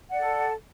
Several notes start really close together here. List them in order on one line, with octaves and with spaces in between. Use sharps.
F#5 D5 A4